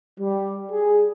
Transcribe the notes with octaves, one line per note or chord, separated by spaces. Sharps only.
G3
G#4